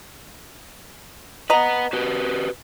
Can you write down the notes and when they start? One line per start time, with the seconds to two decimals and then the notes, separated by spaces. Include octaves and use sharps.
1.50 B4 D#5 F#5 A#5
1.93 F#4 G4 B4